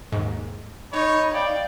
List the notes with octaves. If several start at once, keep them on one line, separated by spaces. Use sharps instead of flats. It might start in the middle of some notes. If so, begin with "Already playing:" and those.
D#2 G#2
D#4 C#5 B5
D5 F5 G5